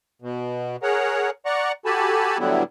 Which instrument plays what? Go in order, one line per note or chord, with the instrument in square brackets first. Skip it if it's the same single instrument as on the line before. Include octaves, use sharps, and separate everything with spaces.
[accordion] B2
G#4 A#4 C#5 F#5
D5 F#5 A#5 C#6
F#4 G4 A4 G#5 A5 B5
A2 D3 F#3 G3 B3 E4